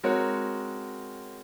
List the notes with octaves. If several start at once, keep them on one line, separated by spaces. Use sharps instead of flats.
G#3 C4 F#4 A#4 C#5